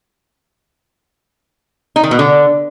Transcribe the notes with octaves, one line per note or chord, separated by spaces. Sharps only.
D#4
D#3
B2
D3